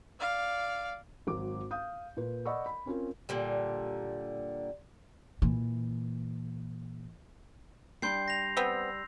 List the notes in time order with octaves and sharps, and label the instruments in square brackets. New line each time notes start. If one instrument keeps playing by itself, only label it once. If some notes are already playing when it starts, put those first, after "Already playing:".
[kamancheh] D5 F5
[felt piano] G#1 F#3 D6
F5 D#6 G6
A#2 B4
D5 D#5 F#5 B5 C#6 E6
B5
C4 C#4 F4 A#4
[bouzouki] A#2 D3 G3
[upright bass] A#2 E3
[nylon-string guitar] G3 D4 [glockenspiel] C6 G6 C7
[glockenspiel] A#6 F7
[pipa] B3 C4 [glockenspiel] E6